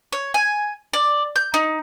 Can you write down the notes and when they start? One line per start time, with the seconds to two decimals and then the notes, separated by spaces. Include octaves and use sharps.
0.13 C#5
0.34 G#5
0.93 D5
1.36 G6
1.54 D#4